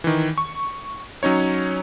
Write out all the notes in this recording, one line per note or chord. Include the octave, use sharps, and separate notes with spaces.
D#3 E3
C#6
F#3 C#4 D#4 C#5